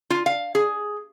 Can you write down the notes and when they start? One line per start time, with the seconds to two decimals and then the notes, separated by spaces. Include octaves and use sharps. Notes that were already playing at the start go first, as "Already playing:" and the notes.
0.10 F4
0.26 F5
0.55 G#4